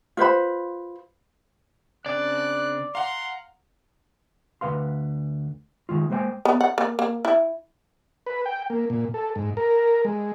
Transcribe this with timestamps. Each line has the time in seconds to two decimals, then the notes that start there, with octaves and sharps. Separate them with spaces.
0.17 F4 B4 C5 B5
2.06 C#3 C4 D4 D5 F#6
2.95 F5 F#5 A#5 C6
4.61 D2 D#3 B4 F5 C6
5.89 D#3 G#3 F4
6.10 G#3 A#3 C5 D#5 G5 G#5
6.45 B3
6.61 F#5
6.78 A#3
6.99 A#3
7.25 E4
8.26 B4
8.46 G5
8.70 A#3
8.90 A#2
9.14 A4
9.36 G#2
9.57 A#4
10.05 G#3